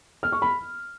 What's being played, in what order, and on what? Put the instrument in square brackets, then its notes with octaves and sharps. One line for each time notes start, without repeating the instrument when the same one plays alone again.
[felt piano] F6
C#6
B5